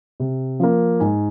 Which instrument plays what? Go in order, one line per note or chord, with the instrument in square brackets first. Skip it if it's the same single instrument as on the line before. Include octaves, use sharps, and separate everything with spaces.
[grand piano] C3
F3 A#3
G#2 G#5